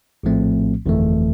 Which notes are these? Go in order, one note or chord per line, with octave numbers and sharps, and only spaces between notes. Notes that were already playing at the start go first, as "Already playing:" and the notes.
A#1 A2 F3 A3 C4
G1 F2 E3 A3